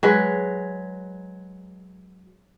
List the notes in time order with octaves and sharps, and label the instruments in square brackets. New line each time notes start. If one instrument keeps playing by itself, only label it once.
[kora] F#3 G#3 B4